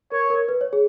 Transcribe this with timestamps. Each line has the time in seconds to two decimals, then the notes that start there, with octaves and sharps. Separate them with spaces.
0.12 A#4 C#5
0.30 A#4
0.49 B4
0.61 C#5
0.73 G#4